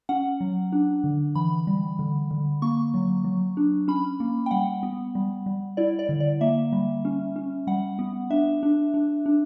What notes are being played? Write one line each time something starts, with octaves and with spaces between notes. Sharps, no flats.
C#4 F#5
F#3
D4
D3
E3 B5
G3
D3
D3
A#3 C#6
F#3
F#3
D4
C#4 B5
A#3
G5
G3 F#5
B3
G3
G3
E4 D5
D5
D3
D5
A#3 E5
G3
C#4
C#4
G3 F#5
B3
D4 E5
D4
D4
D4